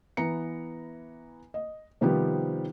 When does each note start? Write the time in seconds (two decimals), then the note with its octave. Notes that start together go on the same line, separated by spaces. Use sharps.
0.17 E3 B3 A#5 C#7
1.54 D#5
2.01 C3 D#3 F3 G3 B3 G4